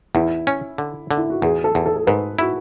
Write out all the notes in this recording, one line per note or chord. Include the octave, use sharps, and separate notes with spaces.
E2 E4
C#4
D3
D3
E4
F#4
E2 G#4
A4
E2
A4
A4
G#2 B4
E4 F#4